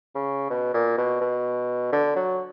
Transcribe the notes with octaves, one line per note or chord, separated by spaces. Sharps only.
C#3
B2
A#2
B2
B2
D3
F#3